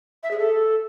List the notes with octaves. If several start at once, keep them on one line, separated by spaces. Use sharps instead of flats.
E5
G#4
A4